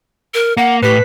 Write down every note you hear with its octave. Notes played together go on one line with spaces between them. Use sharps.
A#4
A#3 F#5
A2 G4 B4 B6